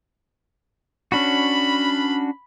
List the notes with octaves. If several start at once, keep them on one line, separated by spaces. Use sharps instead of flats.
C#4 D4 F#4 B5